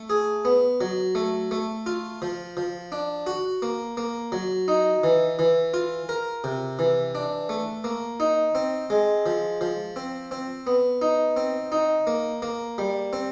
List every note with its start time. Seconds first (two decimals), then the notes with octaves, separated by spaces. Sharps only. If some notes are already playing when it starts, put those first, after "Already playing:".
Already playing: A3
0.10 G#4
0.45 B3
0.81 F#3
1.15 A3
1.51 A3
1.86 F4
2.22 F3
2.57 F3
2.92 D4
3.27 F#4
3.62 A#3
3.97 A#3
4.32 F#3
4.68 D#4
5.04 E3
5.39 E3
5.74 F4
6.09 A#4
6.44 C3
6.79 E3
7.15 D4
7.49 A3
7.84 A#3
8.20 D#4
8.55 C4
8.90 G#3
9.26 F3
9.61 F3
9.96 C4
10.31 C4
10.67 B3
11.02 D#4
11.37 C4
11.72 D#4
12.07 A#3
12.42 A#3
12.78 G3
13.13 C4